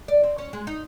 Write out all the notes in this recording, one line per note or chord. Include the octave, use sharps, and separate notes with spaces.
D5
C4
C#4
G#3
D#4